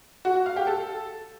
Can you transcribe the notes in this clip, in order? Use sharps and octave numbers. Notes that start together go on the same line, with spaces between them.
F#4
F#4
F5
G4
A4